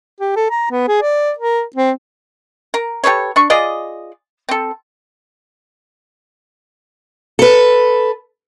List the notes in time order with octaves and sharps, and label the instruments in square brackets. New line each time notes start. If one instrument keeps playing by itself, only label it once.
[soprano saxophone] G4
A4
A#5
B3
G#4
D5
A#4
C4
[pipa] A#4
G4 A4 B4 C#5
D4 C#6
F4 G#4 D5 D#5
C4 A4
[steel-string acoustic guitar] A4 B4